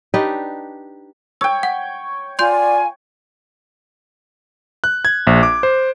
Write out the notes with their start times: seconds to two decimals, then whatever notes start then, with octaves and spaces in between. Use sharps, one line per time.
0.14 D4 D#4 G4 B4
1.41 C#5 G5 E6
1.63 F#5
2.39 F4 D5 G#5 C6 G6
4.84 F#6
5.05 G#6
5.27 A#1
5.43 D6
5.63 C5